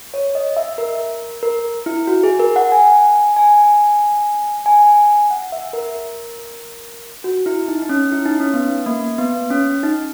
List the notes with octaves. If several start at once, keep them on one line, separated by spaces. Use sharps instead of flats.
C#5
D#5
E5
A#4
A#4
E4
F#4
G#4
A#4
F#5
G#5
G#5
G#5
F#5
E5
A#4
F#4
E4
D#4
D#4
C#4
E4
D#4
C#4
B3
A#3
B3
C#4
D#4